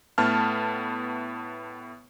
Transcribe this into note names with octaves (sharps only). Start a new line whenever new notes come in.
A2 A3 B3 A5 F6